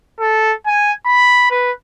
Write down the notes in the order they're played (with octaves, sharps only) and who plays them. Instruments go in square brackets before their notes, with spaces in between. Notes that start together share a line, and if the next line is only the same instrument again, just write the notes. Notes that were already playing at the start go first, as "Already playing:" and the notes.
[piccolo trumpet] A4
G#5
B5
B4